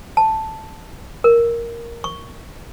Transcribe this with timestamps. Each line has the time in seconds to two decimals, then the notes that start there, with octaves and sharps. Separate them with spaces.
0.17 A5
1.24 A#4
2.04 C#6